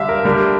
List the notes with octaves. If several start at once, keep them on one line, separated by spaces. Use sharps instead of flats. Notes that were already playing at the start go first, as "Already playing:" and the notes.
Already playing: D3 G3 E5 F5
A#4
D3 G3 A#4